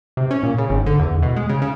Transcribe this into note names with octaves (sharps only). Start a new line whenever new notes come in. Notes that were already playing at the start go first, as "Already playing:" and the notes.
C3
C#4
A#2
C#3
G#1
D3
E2
B2
G#3
C#3
C#3